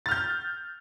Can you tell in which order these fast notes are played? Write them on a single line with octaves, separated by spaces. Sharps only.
A6 F6 G6